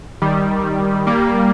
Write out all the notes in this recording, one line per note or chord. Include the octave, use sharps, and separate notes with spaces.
D#3 G3
G3 A#3